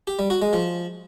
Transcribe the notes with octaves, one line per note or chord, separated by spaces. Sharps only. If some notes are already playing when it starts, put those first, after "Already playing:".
G4
G3
F#4
G#3
F3